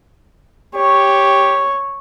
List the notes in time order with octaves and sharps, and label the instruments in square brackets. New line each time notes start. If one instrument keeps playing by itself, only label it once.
[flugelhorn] G4 [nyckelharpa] C#5